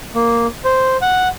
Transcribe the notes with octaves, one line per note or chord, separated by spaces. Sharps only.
A#3
C5
F#5